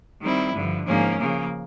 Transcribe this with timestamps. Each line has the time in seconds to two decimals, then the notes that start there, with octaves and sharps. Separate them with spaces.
0.22 D#3 G3 C4 E4
0.55 G2 D3 F3
0.86 G#2 F3 A#3 C#4
1.19 C#3 F3 A#3